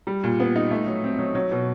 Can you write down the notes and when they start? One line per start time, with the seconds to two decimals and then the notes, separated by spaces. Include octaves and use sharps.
0.07 G3
0.24 A#2
0.40 B3
0.56 D#4
0.71 A3
0.87 F#3
1.04 C4
1.19 F#3
1.35 F#3
1.51 B2